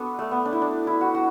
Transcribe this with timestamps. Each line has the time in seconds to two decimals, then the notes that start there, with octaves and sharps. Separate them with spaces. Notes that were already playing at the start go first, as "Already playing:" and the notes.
Already playing: B3 D4 F#4 A4
0.19 A3
0.31 B3
0.45 D4
0.53 E4
0.62 D4
0.87 E4
1.01 F#4
1.14 F#4